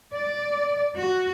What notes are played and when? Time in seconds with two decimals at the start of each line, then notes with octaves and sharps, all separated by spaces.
0.12 D5
0.96 F#4